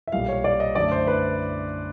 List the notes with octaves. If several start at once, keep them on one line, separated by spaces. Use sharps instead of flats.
E5
B1 A#2 G3 A#3 F5
C#5
D5
D#5
F#2 D3 F#3 A3 D5
C5
B4